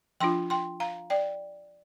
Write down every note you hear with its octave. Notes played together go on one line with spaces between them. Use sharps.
F3 D4 F4 G5 C6
G5 C6
F5 A#5
D5 G5